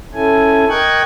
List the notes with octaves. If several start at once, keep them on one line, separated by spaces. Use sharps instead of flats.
C#4 E4 A4 G#5
A#4 D#5 G5 C#6 F#6 G#6